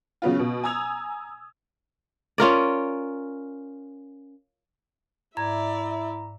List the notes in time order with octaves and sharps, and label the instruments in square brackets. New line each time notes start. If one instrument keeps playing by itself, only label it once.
[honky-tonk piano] C#3 F#3 B3 F4
B2
G#5 A#5 D#6 E6 G#6 F7
[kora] C#4 F4 A#4 D5
[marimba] G#2 G#6 [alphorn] E4 [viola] D5 E5 [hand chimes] A#5